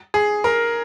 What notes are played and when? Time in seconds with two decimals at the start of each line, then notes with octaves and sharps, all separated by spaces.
0.14 G#4
0.44 A#4